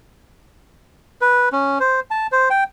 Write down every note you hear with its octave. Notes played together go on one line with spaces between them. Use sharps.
B4
C#4
C5
A5
C5
G5